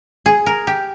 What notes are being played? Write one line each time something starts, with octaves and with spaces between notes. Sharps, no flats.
G#4
A#4
G4